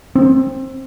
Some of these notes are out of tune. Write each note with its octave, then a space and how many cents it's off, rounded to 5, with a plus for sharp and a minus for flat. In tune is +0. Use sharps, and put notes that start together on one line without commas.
C4 +15